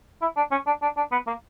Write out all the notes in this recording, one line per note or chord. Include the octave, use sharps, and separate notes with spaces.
E4
D4
C#4
D4
D4
D4
B3
A#3